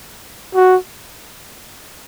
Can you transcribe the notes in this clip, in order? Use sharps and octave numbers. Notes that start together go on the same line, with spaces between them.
F#4